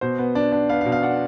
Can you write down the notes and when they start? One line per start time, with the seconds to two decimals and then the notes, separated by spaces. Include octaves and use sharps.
0.01 B2 C5
0.19 B3
0.35 D4
0.52 D4
0.69 B3 F5
0.81 F5
0.85 B2
0.92 F5
1.03 D4 F#5